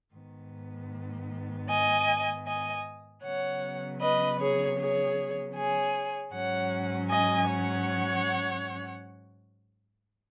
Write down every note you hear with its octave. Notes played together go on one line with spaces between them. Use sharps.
G#2 D#3 B3
D#5 G#5
D#5 G#5
C#3 F#3 B3 C#5 F#5
B4 D#5
G#4 C#5
G#4 C#5
G#4 C#5
G#2 F#3 C#4 C#5 F#5
D#5 G#5
C#5 F#5